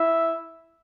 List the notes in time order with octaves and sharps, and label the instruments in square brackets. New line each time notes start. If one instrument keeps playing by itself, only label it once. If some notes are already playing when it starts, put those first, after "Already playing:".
Already playing: [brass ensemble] E4 E5